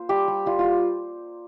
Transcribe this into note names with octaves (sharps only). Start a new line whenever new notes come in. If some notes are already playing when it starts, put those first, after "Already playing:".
Already playing: A#3 F4 C5
G3 G4
G3
G3 F4
F4
G3